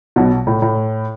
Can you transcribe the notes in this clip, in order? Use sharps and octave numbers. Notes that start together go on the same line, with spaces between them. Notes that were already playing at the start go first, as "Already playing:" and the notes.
B1 B2
A2
A2